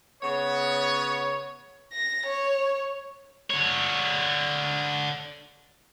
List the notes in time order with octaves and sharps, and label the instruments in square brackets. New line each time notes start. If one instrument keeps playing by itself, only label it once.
[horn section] C#3 B3 C#5
[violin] A#6
C#5
[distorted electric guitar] D3 C#5